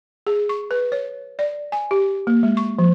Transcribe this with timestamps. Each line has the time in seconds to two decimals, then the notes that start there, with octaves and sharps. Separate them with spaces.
0.27 G#4
0.49 C#6
0.71 B4
0.92 C#5
1.39 D5
1.72 G#5
1.91 G4
2.27 A#3
2.43 G#3
2.57 C#6
2.79 F3